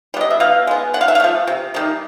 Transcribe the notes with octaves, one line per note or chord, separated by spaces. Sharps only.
G3 B3
D#5
E5
B2 F5
G#3 B3
D3 F#5
F5
E5
F5
F3 A3
C3
D#3 G3 A#3